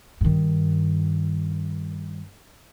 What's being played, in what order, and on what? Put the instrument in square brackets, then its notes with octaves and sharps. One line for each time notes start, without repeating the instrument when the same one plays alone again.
[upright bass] G2 D#3